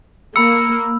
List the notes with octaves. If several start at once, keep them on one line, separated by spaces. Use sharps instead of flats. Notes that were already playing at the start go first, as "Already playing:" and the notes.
A#3 B5 E6 C#7